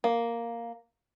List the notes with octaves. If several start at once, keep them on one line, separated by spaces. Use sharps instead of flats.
A#3